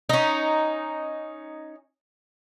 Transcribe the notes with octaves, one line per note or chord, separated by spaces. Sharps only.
C#4 D#4